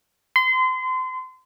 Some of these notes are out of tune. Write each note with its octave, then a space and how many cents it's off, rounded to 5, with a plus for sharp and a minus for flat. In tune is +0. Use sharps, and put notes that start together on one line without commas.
C6 -30